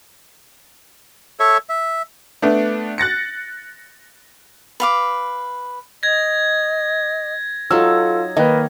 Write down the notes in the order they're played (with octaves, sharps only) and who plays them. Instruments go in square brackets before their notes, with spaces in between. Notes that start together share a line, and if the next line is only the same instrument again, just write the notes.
[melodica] A4 C#5 E5
E5
[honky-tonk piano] A3 B3 D4
F#6 A6 A#6 C#7
[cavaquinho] B4 F5 D6
[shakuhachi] D#5 [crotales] G#6 A#6
[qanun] F#3 D#4 [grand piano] F4 E6 [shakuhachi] A4
[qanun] D#3 [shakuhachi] A#3 [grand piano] B4 D#5